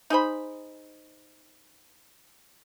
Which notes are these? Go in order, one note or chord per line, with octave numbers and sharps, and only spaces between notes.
D#4 G#4 C5 B5